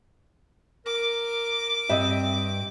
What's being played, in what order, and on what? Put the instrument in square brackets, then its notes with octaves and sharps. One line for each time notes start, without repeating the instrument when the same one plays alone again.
[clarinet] A#4 [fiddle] D6
[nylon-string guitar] G2 [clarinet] C4 [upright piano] D#5 E5